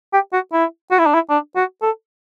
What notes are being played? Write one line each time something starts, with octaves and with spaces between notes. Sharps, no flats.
G4
F#4
E4
F#4
E4
D4
E4
D4
F#4
A4